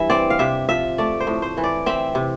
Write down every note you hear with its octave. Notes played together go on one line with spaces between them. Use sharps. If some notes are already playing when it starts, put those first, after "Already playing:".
Already playing: G2 E3 E5
C4 D5
F5
C3 E5
F3 E5
A3 D5
C5
A2
C5
E3
D5
C4 E5
C3